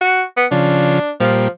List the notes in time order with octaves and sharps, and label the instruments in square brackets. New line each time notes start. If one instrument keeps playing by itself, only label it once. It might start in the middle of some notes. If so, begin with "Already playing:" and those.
[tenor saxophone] F#4
B3
[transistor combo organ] C#3 F3 [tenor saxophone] D4
[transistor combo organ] A#2 G3 [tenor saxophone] F3